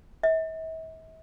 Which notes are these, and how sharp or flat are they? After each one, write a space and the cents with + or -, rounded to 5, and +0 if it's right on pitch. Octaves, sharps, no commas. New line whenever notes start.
E5 -40